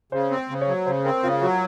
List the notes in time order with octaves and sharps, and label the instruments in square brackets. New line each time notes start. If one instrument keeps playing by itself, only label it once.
[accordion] C#3 [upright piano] C5
[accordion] C4
[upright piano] C5
[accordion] C#3
[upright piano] C#5
[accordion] F#3
[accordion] C#3 [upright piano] C5
[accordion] C4 [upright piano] A#4
[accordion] C#3 [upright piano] F4
[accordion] F#3 [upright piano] F#4